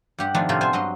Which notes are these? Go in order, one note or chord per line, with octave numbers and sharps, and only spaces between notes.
G2 G4 F#5
D#3 F3 A3 B3 D4
A2 C3 A3 A#3 F4
B3 C5 G#5
G2 F#3 B4 D#5 C6